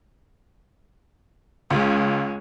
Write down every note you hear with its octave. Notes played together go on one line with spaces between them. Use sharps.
C#2 G#3 C#4